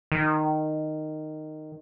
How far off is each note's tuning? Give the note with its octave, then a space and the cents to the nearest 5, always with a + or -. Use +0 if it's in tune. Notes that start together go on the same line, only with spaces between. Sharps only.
D#3 -10